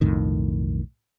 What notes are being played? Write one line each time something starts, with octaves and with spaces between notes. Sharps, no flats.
B1 F2 A2 D#3